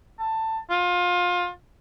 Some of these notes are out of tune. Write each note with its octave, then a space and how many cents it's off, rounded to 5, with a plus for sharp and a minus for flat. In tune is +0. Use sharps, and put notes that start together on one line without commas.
A5 +15
F4 +25